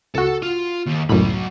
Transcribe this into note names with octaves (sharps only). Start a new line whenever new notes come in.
C#2 F#4 A4
F4
D#2
C#2 F#2 A2 F#3 B5